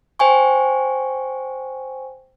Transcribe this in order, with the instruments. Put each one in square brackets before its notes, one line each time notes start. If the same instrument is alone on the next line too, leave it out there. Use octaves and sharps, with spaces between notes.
[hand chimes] C5 G5 G#5 C#6